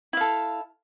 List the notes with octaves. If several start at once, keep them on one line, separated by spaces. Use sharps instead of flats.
E4 A4 F5